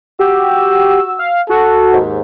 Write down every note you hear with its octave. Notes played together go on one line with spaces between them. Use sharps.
F#4 G4 E6
F5
F#4 A4
D#2 G#2